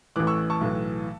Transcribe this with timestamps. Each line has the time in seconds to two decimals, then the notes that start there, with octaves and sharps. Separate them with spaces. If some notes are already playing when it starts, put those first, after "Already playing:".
0.16 A1 A2 E3 D6 F#6
0.27 C#6 E6
0.50 A5 C#6
0.61 B1 A2 E3